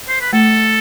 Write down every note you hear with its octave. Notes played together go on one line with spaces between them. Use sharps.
C5
B4
A3 A4